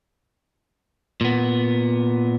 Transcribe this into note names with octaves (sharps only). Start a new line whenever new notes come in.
A#2 B3